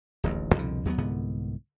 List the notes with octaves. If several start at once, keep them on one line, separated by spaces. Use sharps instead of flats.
D1 A1 D#2
C2 F2 B2 D3
D#2 F#3 A#3 B3
C2 G#2 D3 B3